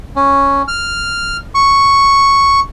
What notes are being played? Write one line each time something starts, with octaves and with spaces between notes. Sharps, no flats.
C#4
F6
C#6